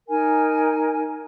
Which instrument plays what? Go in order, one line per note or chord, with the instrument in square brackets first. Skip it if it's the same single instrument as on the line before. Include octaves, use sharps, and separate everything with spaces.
[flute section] D#4 A#4 G#5